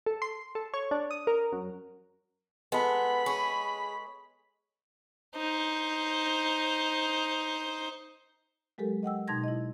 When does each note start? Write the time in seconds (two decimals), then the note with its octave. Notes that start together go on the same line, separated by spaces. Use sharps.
0.06 A4
0.22 C6
0.55 A4
0.74 C#5
0.91 D4
1.11 D#6
1.27 A#4
1.53 F#2
2.72 G#3 B3 A4 B5
3.26 G#4 C#5
5.36 D#4 C5
8.78 F#3 G#3 G4 A4 A#4
9.03 D#5 F#5 G5 E6
9.28 B2 D#4 A5 C6 G#6 A#6
9.44 E4 D#5